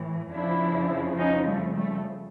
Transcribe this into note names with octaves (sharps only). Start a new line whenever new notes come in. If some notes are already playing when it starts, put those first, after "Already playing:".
Already playing: A2 E3
F2 C#3 F3 D4 E4
C#4 D#4
G3 A3
G3 A3